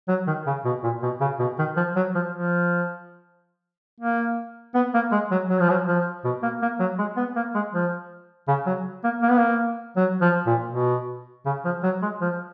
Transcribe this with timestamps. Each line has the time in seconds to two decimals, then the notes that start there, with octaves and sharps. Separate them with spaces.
0.08 F#3
0.27 D#3
0.46 C#3
0.65 B2
0.83 A#2
1.03 B2
1.21 C#3
1.39 B2
1.58 D#3
1.76 F3
1.96 F#3
2.15 F3
2.32 F3
4.00 A#3
4.75 B3
4.94 A#3
5.12 G#3
5.31 F#3
5.50 F#3
5.59 F3
5.69 F#3
5.87 F3
6.24 B2
6.43 A#3
6.62 A#3
6.79 F#3
6.98 G#3
7.17 B3
7.36 A#3
7.55 G#3
7.74 F3
8.48 C#3
8.66 F#3
9.04 A#3
9.22 A#3
9.30 B3
9.38 A#3
9.96 F#3
10.21 F3
10.46 A#2
10.72 B2
11.45 C#3
11.65 F3
11.83 F#3
12.02 G#3
12.21 F3